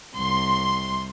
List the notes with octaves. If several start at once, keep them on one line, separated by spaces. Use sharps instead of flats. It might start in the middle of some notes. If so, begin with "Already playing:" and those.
C2 C6